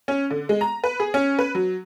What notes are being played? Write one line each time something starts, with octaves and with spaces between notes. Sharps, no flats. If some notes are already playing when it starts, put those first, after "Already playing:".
C#4
D3
G#3
A#5
B4
G#4
C#4
B4
F#3